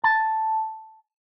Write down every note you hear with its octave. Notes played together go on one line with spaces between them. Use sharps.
A5